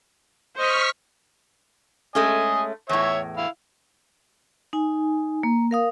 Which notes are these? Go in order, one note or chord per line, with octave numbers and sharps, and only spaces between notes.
C5 D#5 C#6 F6 B6
G#3 A3 C#4 D#5 G#5
E2 A2 C#5 E5 C#6
E4 F5
D#4 G#5
A#3
A#4 F5 D#6